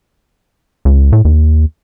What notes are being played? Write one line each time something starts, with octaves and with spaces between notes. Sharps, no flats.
C#2
A2
D#2